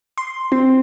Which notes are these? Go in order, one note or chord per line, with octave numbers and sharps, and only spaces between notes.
C6
C4